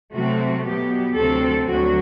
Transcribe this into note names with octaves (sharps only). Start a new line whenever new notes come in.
C3 F#3 A3 C4 F#4
B2 F#3 B3 G4
D2 C3 F#3 C4 A4
D2 D3 F#3 F#4